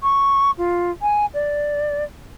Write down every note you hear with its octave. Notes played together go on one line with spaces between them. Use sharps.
C#6
F4
G#5
D5